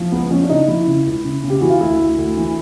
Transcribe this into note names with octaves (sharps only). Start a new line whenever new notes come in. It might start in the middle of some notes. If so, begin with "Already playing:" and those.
Already playing: F3
C#2 B3
F3 C#4
D4
C#3 D#4
F3 E4
C#3
C#2
C#3
C#3
G4
E3 F#4
F4
D2 E4
D2
D2
E3